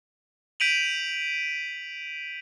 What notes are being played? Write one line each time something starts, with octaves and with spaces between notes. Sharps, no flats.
G6 B6 D7 D#7 F7 F#7